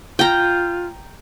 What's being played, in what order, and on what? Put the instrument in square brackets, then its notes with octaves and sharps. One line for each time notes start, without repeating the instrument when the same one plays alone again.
[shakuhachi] F4 [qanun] G5 A#5